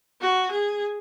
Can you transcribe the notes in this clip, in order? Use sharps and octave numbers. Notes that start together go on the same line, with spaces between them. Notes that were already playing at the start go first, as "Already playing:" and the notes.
F#4
G#4